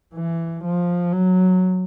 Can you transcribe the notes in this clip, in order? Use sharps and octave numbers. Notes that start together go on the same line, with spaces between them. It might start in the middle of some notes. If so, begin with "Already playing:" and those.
E3
F3
F#3